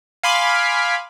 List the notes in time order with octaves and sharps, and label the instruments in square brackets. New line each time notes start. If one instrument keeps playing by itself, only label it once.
[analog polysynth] F5 G#5 B5 C6 D6